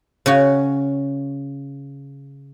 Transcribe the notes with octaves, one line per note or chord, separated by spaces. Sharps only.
C#3 C#4 F#4